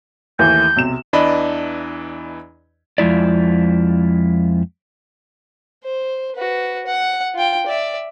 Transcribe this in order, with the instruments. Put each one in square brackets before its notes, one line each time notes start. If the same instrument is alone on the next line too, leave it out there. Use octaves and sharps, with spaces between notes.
[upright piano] D#2 E3 A3 [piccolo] G6
[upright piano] B1 C3 E7
[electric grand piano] E2 E3 D4 D5 D#5 B5
[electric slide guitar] F2 F3 G#3 E4 D5
[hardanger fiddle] C5
F#4 B4
F#5
F4 G5
D5 E5